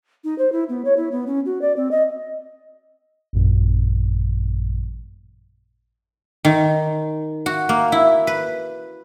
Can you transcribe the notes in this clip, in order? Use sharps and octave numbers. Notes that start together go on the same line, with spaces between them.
D#4
C5
E4
B3
C#5
E4
B3
C#4
F#4
D5
C4
D#5
A1 F#2 A#2
D#3
F#4
A#3
E4
B4